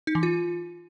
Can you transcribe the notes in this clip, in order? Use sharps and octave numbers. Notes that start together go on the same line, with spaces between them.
D#4
E3
F4